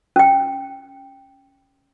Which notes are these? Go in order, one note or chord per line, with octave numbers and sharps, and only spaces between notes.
C#4 G5